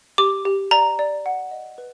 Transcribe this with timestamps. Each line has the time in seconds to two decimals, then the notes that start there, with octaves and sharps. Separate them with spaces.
0.18 G4 D6
0.45 G4
0.71 D5 A#5
0.99 D5
1.26 F#5
1.51 D#5
1.78 B4